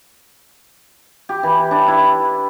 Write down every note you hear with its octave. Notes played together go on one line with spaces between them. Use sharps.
G4
E3
D4
E4